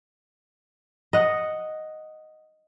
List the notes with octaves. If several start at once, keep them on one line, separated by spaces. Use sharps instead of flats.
D#5 F#5